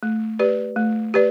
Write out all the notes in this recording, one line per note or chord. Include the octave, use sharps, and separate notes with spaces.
A3
G4 B4 D5
A3
G4 B4 D5